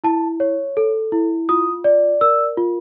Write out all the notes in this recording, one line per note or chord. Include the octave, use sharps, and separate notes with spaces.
E4 A5
C#5
A4
E4
F4 D#6
D5
A#4 E6
F4